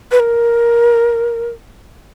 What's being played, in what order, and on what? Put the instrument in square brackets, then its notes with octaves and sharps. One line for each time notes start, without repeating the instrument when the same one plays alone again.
[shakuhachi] B4
A#4